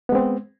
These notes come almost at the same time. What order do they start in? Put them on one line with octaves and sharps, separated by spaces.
B3 G#3 C4